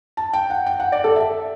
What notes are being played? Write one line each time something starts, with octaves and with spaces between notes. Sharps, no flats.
A5
G5
F#5
G5
F#5
D5
A4
E5